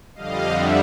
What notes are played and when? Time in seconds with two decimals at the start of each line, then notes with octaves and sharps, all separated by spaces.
0.15 F2 D3 G3 D#5 F5
0.51 E5 F#5